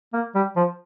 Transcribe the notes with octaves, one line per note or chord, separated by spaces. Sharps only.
A#3
G3
F3